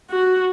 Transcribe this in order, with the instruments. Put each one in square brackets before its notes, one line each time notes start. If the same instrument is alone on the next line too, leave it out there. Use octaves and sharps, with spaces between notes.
[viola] F#4